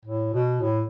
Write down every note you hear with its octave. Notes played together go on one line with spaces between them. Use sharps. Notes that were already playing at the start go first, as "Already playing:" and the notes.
A2
B2
A2